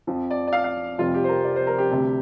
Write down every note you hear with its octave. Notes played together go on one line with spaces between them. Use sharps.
F2 F3
D5
D5
F5
F5
F1 F2 C3 G3 F4
G4
C5
A#4
D5
C5
A#4
G4
D2 C3 G3